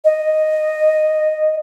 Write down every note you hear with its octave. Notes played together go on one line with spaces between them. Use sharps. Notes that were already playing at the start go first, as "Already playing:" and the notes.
D#5